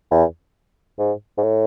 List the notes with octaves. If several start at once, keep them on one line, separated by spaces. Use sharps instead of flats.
E2
G#2
G#2
A2